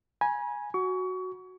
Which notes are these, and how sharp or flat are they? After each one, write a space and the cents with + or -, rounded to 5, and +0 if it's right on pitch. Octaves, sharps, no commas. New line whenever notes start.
G#5 +0 B5 -45
F#4 +0 C#6 +30